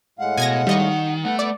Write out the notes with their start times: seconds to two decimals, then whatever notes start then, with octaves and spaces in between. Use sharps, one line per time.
0.19 A2 G#3 F5 F#5
0.37 B2 G#5 G#6 A#6
0.67 D#3 G3 D#5 C#6
1.25 A3 B3 F#5
1.39 B3 D5